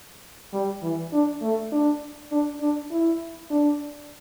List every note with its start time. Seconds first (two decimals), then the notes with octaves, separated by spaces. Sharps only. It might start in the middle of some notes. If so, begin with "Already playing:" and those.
0.53 G3
0.83 E3
1.12 D4
1.42 A3
1.72 D4
2.32 D4
2.61 D4
2.91 E4
3.50 D4